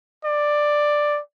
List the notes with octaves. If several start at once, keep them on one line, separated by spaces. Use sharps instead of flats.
D5